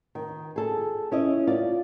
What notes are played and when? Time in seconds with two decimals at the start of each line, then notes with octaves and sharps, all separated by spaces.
0.15 D#3
0.56 G#4 A4
1.12 C#4 E4 D#5
1.47 F4 D5